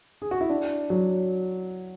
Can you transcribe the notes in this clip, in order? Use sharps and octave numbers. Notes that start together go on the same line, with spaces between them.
G#4
F#4
E4
D4
F#3